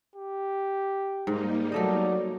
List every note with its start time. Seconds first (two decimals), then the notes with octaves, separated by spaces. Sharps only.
0.16 G4
1.27 G#2 G3 A#3 D#4
1.72 F#3 A3 A4 D5 D#5